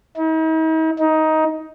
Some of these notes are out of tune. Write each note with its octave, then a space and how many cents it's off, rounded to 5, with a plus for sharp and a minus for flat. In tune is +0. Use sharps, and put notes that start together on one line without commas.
D#4 +45
D#4 +15